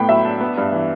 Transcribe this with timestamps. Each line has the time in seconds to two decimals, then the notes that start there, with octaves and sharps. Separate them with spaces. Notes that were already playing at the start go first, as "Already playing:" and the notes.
Already playing: A2 B3 G5 B5
0.09 F#3 E5
0.25 D4
0.40 B3
0.57 G2
0.72 E3